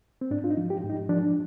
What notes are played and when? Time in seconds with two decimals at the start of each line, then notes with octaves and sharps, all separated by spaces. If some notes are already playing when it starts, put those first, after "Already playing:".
0.21 C4
0.31 G#2 D4
0.44 F4
0.50 D#4
0.57 F3
0.70 G4
0.83 G#2
0.90 D#4
1.09 F3 D4